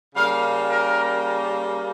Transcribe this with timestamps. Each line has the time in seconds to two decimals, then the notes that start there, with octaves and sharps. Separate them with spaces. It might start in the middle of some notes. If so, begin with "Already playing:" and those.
0.15 C#3 G3 A#3 F5
0.69 A#4